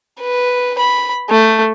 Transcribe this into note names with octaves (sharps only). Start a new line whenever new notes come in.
B4
B5
A3